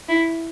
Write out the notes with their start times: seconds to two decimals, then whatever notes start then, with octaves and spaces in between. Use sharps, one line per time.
0.09 E4